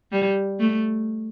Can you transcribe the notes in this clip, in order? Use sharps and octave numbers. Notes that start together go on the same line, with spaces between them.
G3
A3